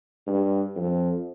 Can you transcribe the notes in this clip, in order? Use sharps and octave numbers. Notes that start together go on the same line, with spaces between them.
G2
F2